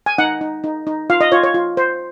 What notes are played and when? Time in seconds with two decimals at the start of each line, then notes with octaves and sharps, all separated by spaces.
0.06 G#5
0.18 D#4 F#5
0.41 D#4
0.64 D#4
0.87 D#4
1.10 F4 F5
1.21 D#5
1.32 F4 C#5
1.44 C#5
1.54 F4
1.77 C5